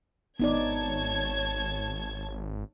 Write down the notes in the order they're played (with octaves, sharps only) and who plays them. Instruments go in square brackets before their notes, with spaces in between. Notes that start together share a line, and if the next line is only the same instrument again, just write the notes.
[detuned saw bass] G#1 [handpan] B3 D#4 D5 [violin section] C#5 A5 G#6